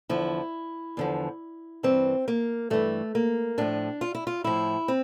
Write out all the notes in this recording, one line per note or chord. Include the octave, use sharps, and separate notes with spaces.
E2 D3 F3 E4
E2 D3 F3
G2 E3 C4
A#3
G2 E3 A3
A#3
A2 F3 D4
F4
E4
F4
A2 F3 E4
C4